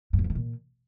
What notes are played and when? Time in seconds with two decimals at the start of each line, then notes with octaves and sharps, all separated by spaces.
0.13 G2
0.19 F2
0.24 F3
0.30 D#3
0.35 A#2